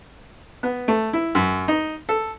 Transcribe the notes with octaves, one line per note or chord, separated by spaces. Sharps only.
B3
A3
E4
F#2
D#4
A4